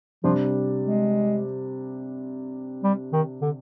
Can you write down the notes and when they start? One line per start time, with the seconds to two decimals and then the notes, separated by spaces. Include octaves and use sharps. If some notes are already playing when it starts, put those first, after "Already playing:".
0.24 C3 F3 G3 D4
0.82 G#3
2.84 G3
3.13 D#3
3.41 D3